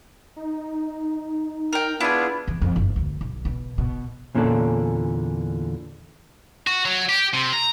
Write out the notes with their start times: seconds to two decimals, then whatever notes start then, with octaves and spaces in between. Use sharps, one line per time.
0.36 D#4
1.73 A#4 G5
2.00 B3 D4 E4 F4 G#4
2.48 E2
2.62 F2
2.76 G1
2.96 D2
3.21 B1
3.45 B2
3.78 B2
4.35 E2 A#2 D3 C#4 D4 A4
6.67 F#4
6.85 F#3
7.09 G4
7.34 C3
7.53 A#5